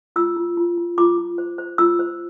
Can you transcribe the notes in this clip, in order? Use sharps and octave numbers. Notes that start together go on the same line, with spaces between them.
F4 E6
F4
F4
F4
F4 D6
F4
C5
C5
F4 E6
C5